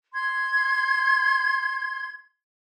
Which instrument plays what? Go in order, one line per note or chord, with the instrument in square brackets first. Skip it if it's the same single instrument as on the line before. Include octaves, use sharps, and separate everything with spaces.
[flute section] C6 G#6